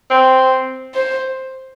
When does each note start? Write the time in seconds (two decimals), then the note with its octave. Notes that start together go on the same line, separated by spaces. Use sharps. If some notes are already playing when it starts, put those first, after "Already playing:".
0.10 C4
0.95 C5